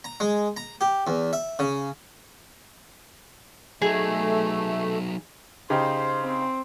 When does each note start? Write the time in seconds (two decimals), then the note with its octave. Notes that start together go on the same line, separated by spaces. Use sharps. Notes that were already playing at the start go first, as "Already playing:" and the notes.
0.04 A#5
0.20 G#3
0.57 A#5
0.81 G4
1.07 E2
1.33 E5
1.59 C#3
3.82 F#3 A3 D#4 G#4
5.70 C#3 D#4 G4 C5
6.23 C4